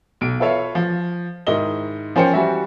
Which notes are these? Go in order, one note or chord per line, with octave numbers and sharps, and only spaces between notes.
B1 D7
F4 A4 B4 C#5 E5 F5
F3
G#2 D#3 E4 A#4 D#5 G7
F3 C#4 A#4 C5 G5 C#7
E3 G3 F#4 E5